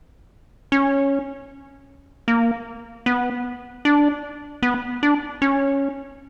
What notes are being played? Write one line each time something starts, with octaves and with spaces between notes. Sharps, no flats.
C#4
A#3
B3
D4
B3
D4
C#4